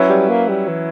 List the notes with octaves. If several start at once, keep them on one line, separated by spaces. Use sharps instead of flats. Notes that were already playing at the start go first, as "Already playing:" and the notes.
Already playing: F#3 C#4 E4 B4 E5
G3
A#3
G3
E3